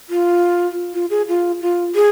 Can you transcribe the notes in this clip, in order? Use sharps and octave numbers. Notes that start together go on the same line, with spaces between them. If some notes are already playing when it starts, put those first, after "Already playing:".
F4
F4
G#4
F4
F4
G#4